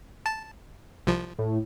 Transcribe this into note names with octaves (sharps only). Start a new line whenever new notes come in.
A5
C2 F3
A2